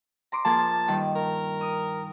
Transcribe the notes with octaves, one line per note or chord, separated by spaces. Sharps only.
A#5 C6 D6
F3 A#3 G#4 A5
G2 D#3
A#4
D#6